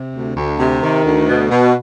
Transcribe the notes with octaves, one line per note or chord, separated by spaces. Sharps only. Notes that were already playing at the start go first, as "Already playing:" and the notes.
Already playing: C3
D2
D2
C3
D#3
D2
B2
B2